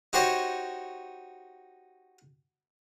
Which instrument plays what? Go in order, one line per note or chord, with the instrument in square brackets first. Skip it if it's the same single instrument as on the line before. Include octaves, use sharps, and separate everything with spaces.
[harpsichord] D#4 F#4 G4 C5 C#5 D#5